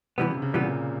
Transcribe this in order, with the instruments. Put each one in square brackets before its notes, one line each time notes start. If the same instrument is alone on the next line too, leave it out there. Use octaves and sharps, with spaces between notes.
[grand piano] C3 [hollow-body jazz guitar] E3 G3 B3
[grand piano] C#3
C3
C#3
[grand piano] A#2 [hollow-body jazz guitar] E3 G3 B3